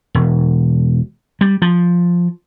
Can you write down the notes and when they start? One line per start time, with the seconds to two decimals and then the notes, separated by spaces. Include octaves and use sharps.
0.14 E1
1.41 G3
1.62 F3